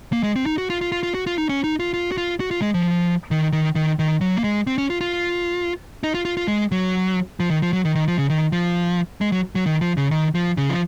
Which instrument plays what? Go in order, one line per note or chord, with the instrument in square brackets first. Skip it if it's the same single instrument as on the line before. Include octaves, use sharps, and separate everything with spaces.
[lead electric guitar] A#3
G#3
C4
D#4
F#4
F4
F4
F4
F4
F#4
F4
D#4
C#4
D#4
F4
F4
F#4
F4
F#4
F4
G#3
F3
D#3
D#3
D#3
D#3
F#3
A#3
G#3
C4
C#4
F4
F4
D#4
F4
F4
F4
G#3
F#3
F3
D#3
F3
F#3
D#3
D#3
F3
C#3
D#3
F3
G#3
F#3
F#3
D#3
F3
C#3
D#3
F3
C#3
F3